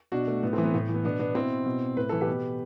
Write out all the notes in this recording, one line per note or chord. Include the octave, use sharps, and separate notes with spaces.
B2 D4 F#4
A3
A2 B3
E3 A3 C4
B3
A2 A3
E3
B3
B2 B3 D4
B3 D4
B2 C4 E4
B2
A2 B4
E3 A4
G4 B4
B2